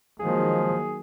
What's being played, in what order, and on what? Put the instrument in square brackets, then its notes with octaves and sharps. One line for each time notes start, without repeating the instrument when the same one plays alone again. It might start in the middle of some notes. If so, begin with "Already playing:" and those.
[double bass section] D#3 F#3 A#3 [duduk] F3 [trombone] G#3 [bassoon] G#4